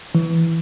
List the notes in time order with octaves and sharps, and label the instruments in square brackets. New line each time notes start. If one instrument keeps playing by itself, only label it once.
[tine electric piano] E3